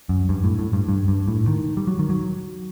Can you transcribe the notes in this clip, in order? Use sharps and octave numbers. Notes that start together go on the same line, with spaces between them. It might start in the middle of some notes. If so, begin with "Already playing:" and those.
F#2
G2
A2
A2
G2
G2
G2
A2
D#3
G3
F#3
D#3
F#3